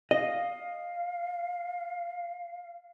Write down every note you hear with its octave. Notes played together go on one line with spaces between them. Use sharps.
D#5 F5